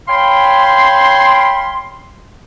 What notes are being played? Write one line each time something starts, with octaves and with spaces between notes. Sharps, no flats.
C#5 F5 G5 B5 C6